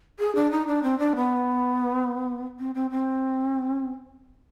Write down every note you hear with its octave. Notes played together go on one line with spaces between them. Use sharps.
G#4
D4
D#4
D4
C4
D4
B3
C4
C4
C4